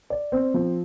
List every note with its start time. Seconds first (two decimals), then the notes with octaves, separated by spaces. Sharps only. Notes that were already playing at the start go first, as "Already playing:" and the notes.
0.10 D5
0.32 C4
0.54 F3